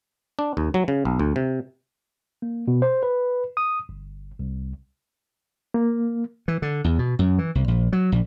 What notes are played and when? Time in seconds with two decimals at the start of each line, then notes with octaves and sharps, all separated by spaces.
0.39 D4
0.57 D#2
0.74 F#3
0.88 C#3
1.05 B1
1.19 D2
1.36 C3
2.42 A#3
2.68 B2
2.82 C5
3.03 B4
3.57 D#6
3.89 G1
4.39 C2
5.74 A#3
6.48 E3
6.62 D3
6.84 E2
6.99 B2
7.19 F#2
7.38 E3
7.55 C2
7.68 A#1
7.93 F#3
8.12 A#1